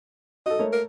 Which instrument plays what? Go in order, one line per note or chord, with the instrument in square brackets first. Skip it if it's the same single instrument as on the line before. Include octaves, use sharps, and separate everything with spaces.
[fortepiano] F#4 A4 [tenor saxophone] D#5
[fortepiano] A3 A#3 C#5
[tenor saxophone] A#4